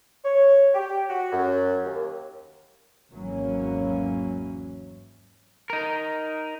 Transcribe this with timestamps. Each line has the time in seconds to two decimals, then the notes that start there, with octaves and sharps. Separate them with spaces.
0.24 C#5
0.74 G4
1.09 F#4
1.32 F#2
1.85 D#2
3.11 G#1 E2 E3 F#3 A#3 C#4
5.70 D#4 A#4